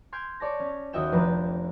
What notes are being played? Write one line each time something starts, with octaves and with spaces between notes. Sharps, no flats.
C6 F6 G6 G#6 D7
C#5 D5 A5 A#6
C#4
D#2 F#4 D#5 E5 G5 E7
F1 F3 D4 B4 A#5